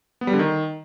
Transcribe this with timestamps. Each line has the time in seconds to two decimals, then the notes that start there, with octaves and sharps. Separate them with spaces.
0.21 B3
0.27 G3
0.33 D3
0.39 D#3